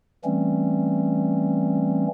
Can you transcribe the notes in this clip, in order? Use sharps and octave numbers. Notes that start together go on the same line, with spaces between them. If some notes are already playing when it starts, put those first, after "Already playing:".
E3 G3 A3 C4 C#4